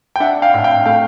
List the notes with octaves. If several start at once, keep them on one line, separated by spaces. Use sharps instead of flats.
G5
D4 E5 F#5
F5 G5
A2
F5 G5
A3 F5 G5